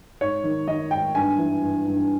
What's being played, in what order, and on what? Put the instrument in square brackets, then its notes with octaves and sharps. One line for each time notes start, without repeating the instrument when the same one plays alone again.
[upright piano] G#2 C#5
D#3
D#3 D#5
G#2 G5
G2 G#5
E3
G2
G2